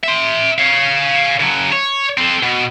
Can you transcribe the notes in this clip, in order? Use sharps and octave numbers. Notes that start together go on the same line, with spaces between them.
E5 C6
C#5 F5
C#3 F#3
C#5
C4 A4
B2